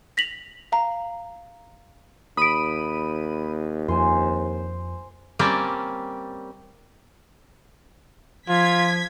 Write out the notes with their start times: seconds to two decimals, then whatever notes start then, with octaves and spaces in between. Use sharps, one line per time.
0.17 A#6 B6 F7 F#7
0.72 F5 A#5
2.37 D#2 B5 D#6 D7 D#7
3.88 F2 C5 G#5 C6
5.39 G3 A#3 C4 C#4 D5
8.49 F3 F4 G#6 B6